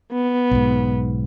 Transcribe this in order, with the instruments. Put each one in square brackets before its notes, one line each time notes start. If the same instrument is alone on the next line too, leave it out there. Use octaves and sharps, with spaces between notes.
[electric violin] B3
[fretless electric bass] B1 G#2